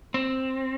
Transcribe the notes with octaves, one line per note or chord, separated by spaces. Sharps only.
C4